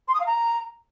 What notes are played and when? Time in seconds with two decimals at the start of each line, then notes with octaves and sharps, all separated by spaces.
0.08 C6
0.14 D#6
0.20 F5
0.26 A#5